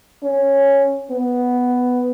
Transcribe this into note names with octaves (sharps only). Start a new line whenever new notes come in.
C#4
B3